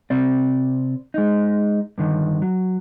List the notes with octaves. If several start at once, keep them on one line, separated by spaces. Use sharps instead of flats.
C3 C4 D5
G#3 D#4
G2 D3 D#3
F#3